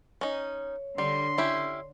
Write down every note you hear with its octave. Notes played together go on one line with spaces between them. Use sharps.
C#4 D#4 C#5
D3 G3 C6
C#4 E4 G4